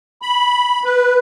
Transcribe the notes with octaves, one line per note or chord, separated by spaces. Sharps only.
B5
B4